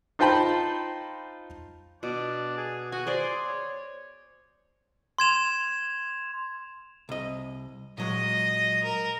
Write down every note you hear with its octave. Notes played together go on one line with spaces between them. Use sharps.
D#4 F4 C5 G5 A5 B5
B2 D4
G#4
F#4 G#5
G#4 C5 D5 G#5
C#5
C6 G#6 E7 F7
C2 D#5
A#2 F#3 G#3 D#5
A#4